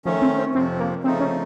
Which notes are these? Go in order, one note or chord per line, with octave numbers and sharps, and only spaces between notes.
D#3 F3 A3 C#4
C4
C4
F2 C3 F3 C4
A#3
C#3 F3 A3 C4 D#4
C#4